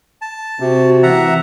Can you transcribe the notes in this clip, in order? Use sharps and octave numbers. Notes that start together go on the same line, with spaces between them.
A5
C3 F#4
E3 E5 F#5 A#5